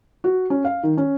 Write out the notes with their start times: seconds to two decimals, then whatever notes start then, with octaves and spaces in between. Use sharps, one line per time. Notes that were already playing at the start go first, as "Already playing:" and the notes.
0.24 F#4
0.50 C#4
0.65 F5
0.83 D#3
0.97 C#4